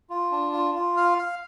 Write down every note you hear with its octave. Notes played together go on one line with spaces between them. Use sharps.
F4
D4
F4
F4
F5
F5